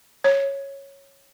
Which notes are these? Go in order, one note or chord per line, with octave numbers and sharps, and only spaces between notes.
C#5